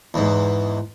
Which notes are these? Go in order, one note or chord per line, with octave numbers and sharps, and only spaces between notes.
E2 G#2